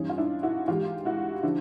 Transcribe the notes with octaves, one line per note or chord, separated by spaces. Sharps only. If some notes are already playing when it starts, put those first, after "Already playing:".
Already playing: G2 E3 C#4 D#4
F4
D4 E4
E4 F#4
G#2 E3 F4 G4
E4 F#4
D3 F3 D4 E4